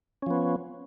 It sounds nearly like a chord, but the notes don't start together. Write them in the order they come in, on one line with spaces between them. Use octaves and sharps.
C#4 F3 B3